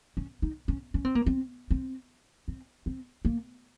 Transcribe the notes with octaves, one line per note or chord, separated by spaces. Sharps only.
C#4
D#4
C#4
C#4
C4
A#3
C4
C4
C4
C4
A#3